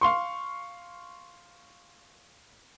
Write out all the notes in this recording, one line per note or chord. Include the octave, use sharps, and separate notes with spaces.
F5 C6 C#6